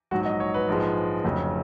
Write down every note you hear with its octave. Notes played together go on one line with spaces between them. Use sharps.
A#1 G#2 F#3 F#4
D#5
C#5
B4
A#1 G#2 F3 G#3
F1 F2 C#3 F#3